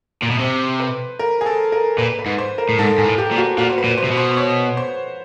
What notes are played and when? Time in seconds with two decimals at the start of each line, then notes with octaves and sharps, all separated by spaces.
0.23 A#2
0.31 B2
0.40 C3 C5
0.80 B4
1.19 A#4
1.41 G#4
1.46 A4
1.72 A#4
1.98 A#2 B4
2.19 B4
2.26 G#2
2.38 C5
2.58 A#4
2.69 A2
2.79 G#2 A4
2.98 G#2 G#4
3.05 A2
3.18 G4
3.31 A#2
3.38 F#4
3.58 A#2 F#4
3.69 C5
3.78 B4
3.84 A#2
3.98 C5
4.04 C3
4.11 B2
4.17 C5
4.31 C5
4.37 C#5
4.77 C5